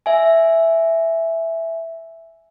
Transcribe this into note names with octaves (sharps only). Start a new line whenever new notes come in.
E5 G#5